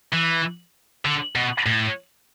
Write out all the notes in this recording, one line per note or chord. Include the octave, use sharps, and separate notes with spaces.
E3
D3
B2
A2